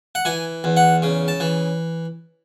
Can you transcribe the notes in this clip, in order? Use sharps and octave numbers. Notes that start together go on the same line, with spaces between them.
F#5
E3 G#5
E2
F#5
C#3
A5
E3